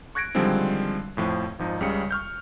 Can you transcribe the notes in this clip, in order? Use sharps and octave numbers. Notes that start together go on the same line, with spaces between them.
C#6 F#6 G#6 A#6 C#7 D7
D3 D#3 F3 G3 G#3 C4
F2 A2 F3
G#1 F3 D#4
C#2 C#3 G3 C#7
C#6 F6 G6